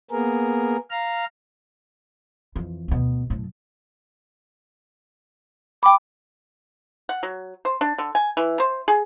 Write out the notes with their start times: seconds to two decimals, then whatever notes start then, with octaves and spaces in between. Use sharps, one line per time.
0.11 A#3 B3 G#4 A#4
0.91 F5 A#5 F6
2.56 F2 E3
2.88 D2 B2
3.30 F#2 A2
5.83 G5 B5 D6
7.09 F#5
7.23 F#3
7.65 C5
7.81 D4
7.98 D3
8.15 G#5
8.37 E3
8.60 C5
8.88 G#4